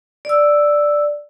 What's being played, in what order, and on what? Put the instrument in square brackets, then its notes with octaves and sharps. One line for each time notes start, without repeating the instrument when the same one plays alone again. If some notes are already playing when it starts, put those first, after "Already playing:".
[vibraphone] D5 E6